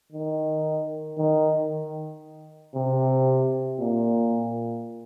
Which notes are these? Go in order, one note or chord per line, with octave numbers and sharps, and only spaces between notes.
D#3
D#3
C3
A#2